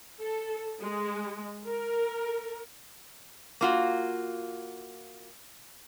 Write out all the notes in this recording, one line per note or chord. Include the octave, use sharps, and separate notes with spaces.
A4
G#3
A#4
A#3 F4 F#4